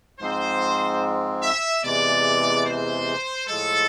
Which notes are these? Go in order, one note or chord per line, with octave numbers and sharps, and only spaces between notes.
G#2 F3 G#3 C4 C5
E5
E2 C3 E3 G#3 D5
C5
A2 F3 G#3 A4